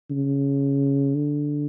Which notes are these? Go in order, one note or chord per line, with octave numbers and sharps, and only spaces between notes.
C#3
D3